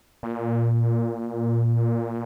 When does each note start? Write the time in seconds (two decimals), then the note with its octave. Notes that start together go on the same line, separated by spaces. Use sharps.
0.23 A#2